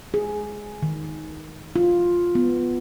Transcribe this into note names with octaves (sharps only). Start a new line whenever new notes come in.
G#4
D#3
F4
B3